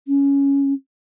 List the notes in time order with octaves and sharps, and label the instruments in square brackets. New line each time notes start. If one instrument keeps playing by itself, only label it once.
[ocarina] C#4